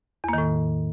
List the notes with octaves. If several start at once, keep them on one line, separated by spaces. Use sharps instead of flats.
E2 A2 D#3 A#3